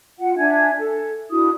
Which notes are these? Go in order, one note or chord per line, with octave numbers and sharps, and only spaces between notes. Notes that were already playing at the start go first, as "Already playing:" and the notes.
F4 F#5
D4 E5 G#5 G#6
A4
D4 E4 F#4 D#6